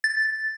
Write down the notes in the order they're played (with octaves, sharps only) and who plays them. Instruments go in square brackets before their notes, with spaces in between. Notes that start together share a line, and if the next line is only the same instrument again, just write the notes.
[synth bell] A6